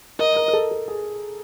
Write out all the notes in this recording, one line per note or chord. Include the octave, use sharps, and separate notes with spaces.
A#4 D#5
A#4
A#4
A4
A4
G#4